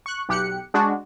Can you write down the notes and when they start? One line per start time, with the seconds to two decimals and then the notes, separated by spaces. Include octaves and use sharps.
0.06 C#6 F#6
0.29 B1 G4 F#6 C#7
0.74 G#3 D4 F#4